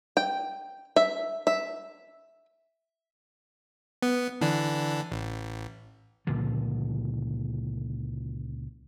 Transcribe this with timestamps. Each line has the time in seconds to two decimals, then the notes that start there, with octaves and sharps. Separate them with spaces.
0.17 G5
0.96 E5
1.47 E5
4.02 B3
4.41 D3 E3 D4
5.12 A1
6.27 C#2 A#2 D3 F3